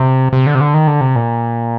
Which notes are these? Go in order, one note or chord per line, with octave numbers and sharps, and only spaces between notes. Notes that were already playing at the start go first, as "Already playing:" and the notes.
Already playing: C3
C3
D3
C3
D3
D#3
D3
C3
A#2